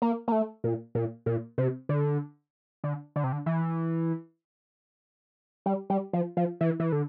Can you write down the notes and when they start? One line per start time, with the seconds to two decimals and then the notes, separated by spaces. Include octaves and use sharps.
0.02 A#3
0.28 A#3
0.32 A3
0.64 A#2
0.95 A#2
1.26 A#2
1.58 C3
1.89 D3
2.84 D3
3.16 D3
3.24 C3
3.33 D3
3.46 E3
5.66 G3
5.90 G3
6.13 F3
6.37 F3
6.61 E3
6.80 E3
6.92 D3